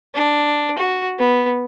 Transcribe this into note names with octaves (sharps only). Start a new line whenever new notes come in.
D4
F#4
B3